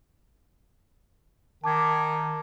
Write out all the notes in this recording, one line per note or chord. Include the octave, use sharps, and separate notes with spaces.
D#3 A5 D6 G#6